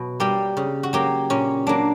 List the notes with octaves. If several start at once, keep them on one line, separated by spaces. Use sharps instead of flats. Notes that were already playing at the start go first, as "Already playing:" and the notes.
Already playing: B2 F#3
G3 A#3 G4
C#3
F#4
F#3 A#3 G4
A#2 C#4
F#3 A#3 D4